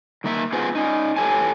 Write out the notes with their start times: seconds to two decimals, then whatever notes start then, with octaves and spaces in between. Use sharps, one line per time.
0.24 D#3 A#3 E5
0.53 B3 C#4 F4 G#4 B4 C5
0.75 C#4 D#4
1.16 A2 G4 A4 C#5 G#5 A5